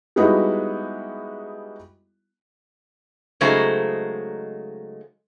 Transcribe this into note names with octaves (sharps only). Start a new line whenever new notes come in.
G3 G#3 B3 D#4 E4 F#4
C#3 F#3 G#3 A3 D#4 C5